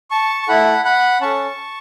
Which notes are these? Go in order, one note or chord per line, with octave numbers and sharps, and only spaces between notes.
A5 C#6
C#6
A3 E4 A4 F#5 B5
F#5 B5
C#4 A4 A5 C#6